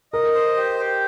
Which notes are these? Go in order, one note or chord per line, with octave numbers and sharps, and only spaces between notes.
A#4 D#5
C5
G4
G4